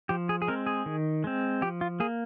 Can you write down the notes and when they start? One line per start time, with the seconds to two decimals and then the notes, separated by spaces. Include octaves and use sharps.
0.09 F3 G4
0.29 G#4
0.42 G#4
0.48 G#3 C4 A#4
0.66 G#4
0.86 D#3
1.24 G#3 C4
1.62 F3 G4
1.81 F4
2.00 A#3 G#4